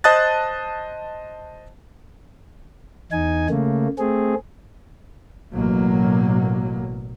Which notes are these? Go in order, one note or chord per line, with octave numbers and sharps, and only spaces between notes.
C5 D#5 A5 D#6 F#6 A6
E2 D#4 G#5
C#3 A3 A#3
A3 C4 G#4
A1 B2 F#3 A#3